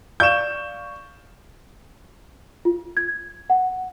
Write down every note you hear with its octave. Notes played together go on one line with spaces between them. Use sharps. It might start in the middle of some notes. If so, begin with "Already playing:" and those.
D5 F5 C#6 G6 E7
F4
G#6
F#5